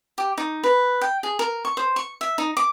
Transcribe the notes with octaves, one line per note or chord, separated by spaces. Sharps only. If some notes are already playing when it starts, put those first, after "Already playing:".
G4
D#4
B4
G5
G#4
A#4
C#6
C5
C#6
E5
D#4
D6